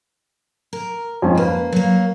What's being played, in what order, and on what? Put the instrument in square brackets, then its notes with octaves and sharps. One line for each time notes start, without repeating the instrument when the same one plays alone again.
[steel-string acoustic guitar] A#4
[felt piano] F2 G#2 C#4
[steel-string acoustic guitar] A#3 [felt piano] B4
[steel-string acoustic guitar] F#3 A#3